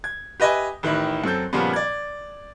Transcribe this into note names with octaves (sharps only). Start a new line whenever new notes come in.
G#6
G4 B4 D#5 E5 G#5
A1 D#3 E4 F#6
F#2 C4 A4 G6
A#2 C#3 F3 G3 B3
D5 G#6